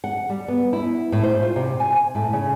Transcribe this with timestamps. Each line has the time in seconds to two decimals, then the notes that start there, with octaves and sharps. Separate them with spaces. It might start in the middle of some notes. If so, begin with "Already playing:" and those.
0.04 F#5
0.29 G3
0.48 B3
0.73 E4
1.12 A2
1.23 C5
1.42 F4
1.56 C3
1.80 G#5
2.15 A2
2.33 C#3